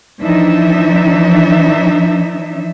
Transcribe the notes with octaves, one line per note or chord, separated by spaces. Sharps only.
E3 F3 D4 D#4 E5